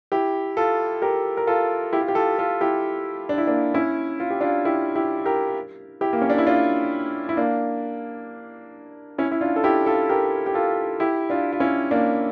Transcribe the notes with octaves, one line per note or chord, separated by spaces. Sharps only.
E4 G4
F4 A4
G4 A#4
A#4
F4 A4
E4 G4
F4
G4
F4 A4
F4 A4
E4 G4
D4
E4
A#3 D4
C#4 E4
F4
G4
D4 F4
E4 G4
E4 G4
G4 A#4
E4 G4
A#3
C#4
D4
E4
D4 F4
E4
A#3 D4
C#4 E4
E4
D4 F4
A4
E4 G4
F4 A4
G4 A#4
G4
F4 A4
E4 G4
D4 F4
F4
C#4 E4
A#3 D4